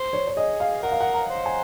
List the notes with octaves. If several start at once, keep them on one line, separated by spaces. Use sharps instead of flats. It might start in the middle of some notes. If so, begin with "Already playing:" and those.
Already playing: C5
C#5
C#5
G#4 D#5
F5
A#4 F#5
F5
F#5
A#5
C5
G#5